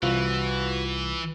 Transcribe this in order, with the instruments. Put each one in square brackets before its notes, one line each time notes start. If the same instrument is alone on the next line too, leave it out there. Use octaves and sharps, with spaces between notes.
[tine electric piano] C2 [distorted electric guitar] E3 [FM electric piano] F4 [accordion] F#4 B4